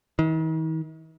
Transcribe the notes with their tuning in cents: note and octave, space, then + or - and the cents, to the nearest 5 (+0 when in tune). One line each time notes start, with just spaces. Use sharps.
D#3 +45